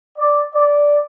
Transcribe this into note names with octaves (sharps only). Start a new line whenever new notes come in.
D5
D5